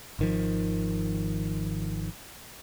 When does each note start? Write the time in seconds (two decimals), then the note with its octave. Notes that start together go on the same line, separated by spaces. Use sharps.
0.19 G#1 D#3 F3